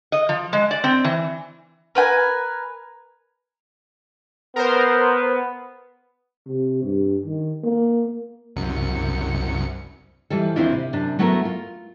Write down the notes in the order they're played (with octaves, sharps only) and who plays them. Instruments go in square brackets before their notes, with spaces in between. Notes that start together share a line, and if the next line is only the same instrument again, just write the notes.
[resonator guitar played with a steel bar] D#5
F3
G#3
D5
C4
E3
[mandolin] A#4 B4 G5 G#5
[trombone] B3 [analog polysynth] A#4 C5
[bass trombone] C3
G2
D#3
A#3
[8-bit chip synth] C2 F#2 C#7
[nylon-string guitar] E3 F3 G3 A4
D#2 C4 D4 E4 F4
C3
F#2 C3 D4
F#3 A3 B3 E4 A4 A#4
F4